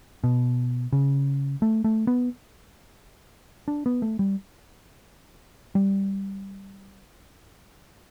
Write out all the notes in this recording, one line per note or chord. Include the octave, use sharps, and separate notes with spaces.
B2
C#3
A3
A3
B3
D4
B3
A3
G3
G3